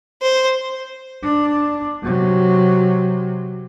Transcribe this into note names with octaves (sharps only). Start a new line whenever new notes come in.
C5
D4
C3 F#3